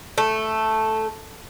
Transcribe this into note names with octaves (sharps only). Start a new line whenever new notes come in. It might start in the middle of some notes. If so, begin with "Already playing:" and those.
A3